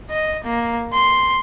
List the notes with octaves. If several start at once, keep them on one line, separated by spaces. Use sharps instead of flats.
D#5
A#3
C6